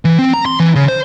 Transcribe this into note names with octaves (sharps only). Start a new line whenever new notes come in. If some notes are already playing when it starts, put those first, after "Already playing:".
E3
C4
A#5
C6
E3
C#3
C5